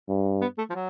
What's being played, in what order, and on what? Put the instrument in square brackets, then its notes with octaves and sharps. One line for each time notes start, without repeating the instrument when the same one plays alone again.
[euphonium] G2
[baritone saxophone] B3
A3
F3
F#3